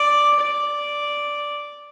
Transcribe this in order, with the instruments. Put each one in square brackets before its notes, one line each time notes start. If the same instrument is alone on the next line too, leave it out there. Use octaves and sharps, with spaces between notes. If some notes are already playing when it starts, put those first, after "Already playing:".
Already playing: [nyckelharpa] D5
D5